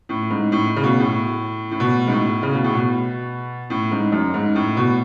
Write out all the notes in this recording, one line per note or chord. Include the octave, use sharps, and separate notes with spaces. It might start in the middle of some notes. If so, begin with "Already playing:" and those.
A2
G#2
A2
C#3
B2
A2
A2
B2
G#2
A2
C#3
B2
A2
B2
A2
G#2
F#2
G#2
A2
B2